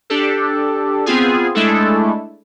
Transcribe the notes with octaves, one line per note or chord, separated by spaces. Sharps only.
D4 G4 A4
B3 C4 F4 G#4
G#3 A3 D4 E4 A4